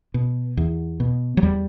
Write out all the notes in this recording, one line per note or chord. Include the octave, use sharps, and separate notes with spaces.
B2
E2
B2
F#3
E2 G3